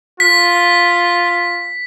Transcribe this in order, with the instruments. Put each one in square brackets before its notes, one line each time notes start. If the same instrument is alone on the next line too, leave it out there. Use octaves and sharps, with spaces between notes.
[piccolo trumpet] F4 [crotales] B6